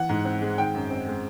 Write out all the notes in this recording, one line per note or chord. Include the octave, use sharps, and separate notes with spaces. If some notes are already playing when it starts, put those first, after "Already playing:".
Already playing: E3 F#5
G#2
C4
G#3
D#3 G5
F#2
C4
G#3